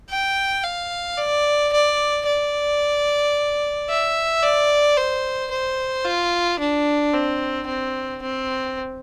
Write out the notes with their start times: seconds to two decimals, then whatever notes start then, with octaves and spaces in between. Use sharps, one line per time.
0.10 G5
0.64 F5
1.17 D5
1.73 D5
2.26 D5
3.89 E5
4.43 D5
4.97 C5
5.51 C5
6.05 F4
6.59 D4
7.14 C4
7.67 C4
8.22 C4